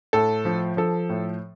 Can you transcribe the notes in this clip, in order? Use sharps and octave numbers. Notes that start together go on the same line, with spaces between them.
A2 A4
F3
F3 A4
A2